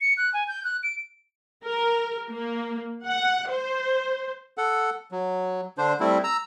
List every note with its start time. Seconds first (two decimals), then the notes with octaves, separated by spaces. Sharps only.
0.01 C#7
0.17 F#6
0.34 G#5
0.48 G6
0.64 F#6
0.83 D7
1.65 A#4
2.30 A#3
3.05 F#5
3.50 C5
4.58 A4 F#5
5.12 F#3
5.78 D3 D4 C5
6.00 G3 A3 C4 E4
6.24 A#5 E6